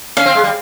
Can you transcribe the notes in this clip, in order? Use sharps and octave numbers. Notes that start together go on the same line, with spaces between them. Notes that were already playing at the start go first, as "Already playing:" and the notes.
C#4 F5
C4
G#3
G3